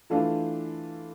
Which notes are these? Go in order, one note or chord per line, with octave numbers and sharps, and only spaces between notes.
E3 A3 D4 F4